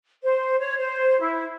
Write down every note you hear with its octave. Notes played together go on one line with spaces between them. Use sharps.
C5
C#5
C5
E4